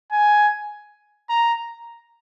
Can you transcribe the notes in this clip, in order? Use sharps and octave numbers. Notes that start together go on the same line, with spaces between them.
G#5
A#5